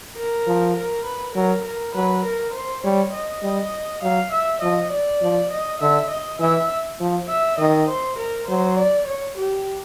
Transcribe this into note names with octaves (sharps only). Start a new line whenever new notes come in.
A#4
F3
A#4
B4
F#3 A#4
A#4
F#3 B4
A#4
C5
G3 C#5
D#5
G3
F#3 F5
E5
F3 D#5
D5
F3
D#5
D3 E5
D#5
E3 E5
F3
E5
D#3 D#5
C5
A#4
F#3 C5
D5
C#5
G4